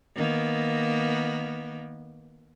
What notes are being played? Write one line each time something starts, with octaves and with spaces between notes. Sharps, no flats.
D#3 A#3 B3